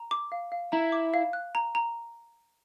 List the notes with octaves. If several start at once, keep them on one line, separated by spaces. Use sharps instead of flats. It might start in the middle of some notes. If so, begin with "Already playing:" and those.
Already playing: A#5
D6
F5
F5
E4 A#5
D6
F5
F#6
A#5
A#5